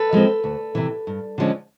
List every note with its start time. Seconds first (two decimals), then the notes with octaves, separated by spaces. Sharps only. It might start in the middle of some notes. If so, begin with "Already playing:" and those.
Already playing: A4 B4
0.13 F3 G#3 C4
0.44 D2
0.75 C3 E3
1.07 G2
1.38 D3 F3 G#3 C#4